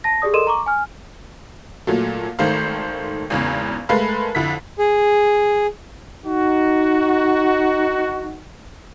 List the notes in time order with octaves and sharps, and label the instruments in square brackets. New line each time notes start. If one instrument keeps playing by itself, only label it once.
[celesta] A5 A#6
G4 G#4 D5 D#6
A4 A#4 D#5 C6 D#7 E7
A#5 C#6 D6
G#5 F6
[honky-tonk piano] A#2 F#3 A3
G#1 D#3 A3 C5 F5
G#1 E2 C#3
G#3 A3 A#4 B4 F5
F2 D3 E4 B6
[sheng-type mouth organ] G#4
[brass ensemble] D#4 F#4